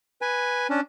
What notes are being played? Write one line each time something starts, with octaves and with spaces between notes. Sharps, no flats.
B4 G#5
C#4 D4